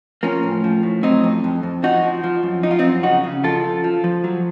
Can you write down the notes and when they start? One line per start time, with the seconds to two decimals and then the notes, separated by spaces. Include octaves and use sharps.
0.23 F3 A#3 C#4
0.43 A2
0.64 F3
0.83 A2
1.03 F#3 C4 D#4
1.24 F2
1.44 F2
1.63 F2
1.83 F3 D#4 F#4
2.03 F3
2.24 F3
2.43 F#2
2.63 F3 D#4
2.71 F4
2.79 C4 D#4
2.84 F#2
3.03 C#3 D#4 F#4
3.24 C#3
3.44 F3 F4 A4
3.64 F3
3.84 F3
4.04 F3
4.24 F#3